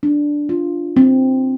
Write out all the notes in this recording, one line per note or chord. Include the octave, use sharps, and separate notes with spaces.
D4
F4
C4